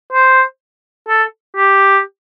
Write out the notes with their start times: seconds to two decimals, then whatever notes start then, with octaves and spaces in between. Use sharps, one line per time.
0.13 C5
1.09 A4
1.56 G4